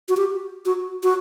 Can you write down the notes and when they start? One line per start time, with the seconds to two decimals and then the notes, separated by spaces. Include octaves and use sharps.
0.09 F#4
0.17 G4
0.66 F#4
1.03 F#4